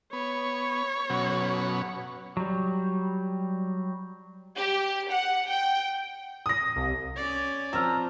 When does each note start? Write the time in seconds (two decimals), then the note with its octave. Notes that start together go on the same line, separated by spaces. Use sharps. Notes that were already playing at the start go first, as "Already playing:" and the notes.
0.13 B3 C#5
1.10 B2 F#3 C#4
2.37 F#3 G3
4.56 G4
5.11 F#5
5.50 G5
6.46 D#6 A#6
6.76 C2
7.16 C#4 D5
7.73 F3 C4 A#5 E6 F6